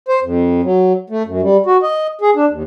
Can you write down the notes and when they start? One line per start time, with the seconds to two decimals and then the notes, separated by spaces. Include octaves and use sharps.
0.09 C5
0.23 F2
0.64 F#3
1.10 A3
1.26 F#2
1.42 G3
1.66 F#4
1.83 D#5
2.21 G#4
2.36 D4
2.50 D#2